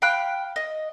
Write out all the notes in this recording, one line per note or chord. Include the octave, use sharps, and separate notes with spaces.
F5 G5 B5 F#6
D#5